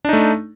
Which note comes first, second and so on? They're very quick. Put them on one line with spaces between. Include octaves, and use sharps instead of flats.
D4 D#4 A3